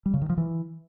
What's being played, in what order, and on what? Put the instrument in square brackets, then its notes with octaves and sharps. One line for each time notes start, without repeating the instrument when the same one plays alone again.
[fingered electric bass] G3
C#3
D#3
F3
E3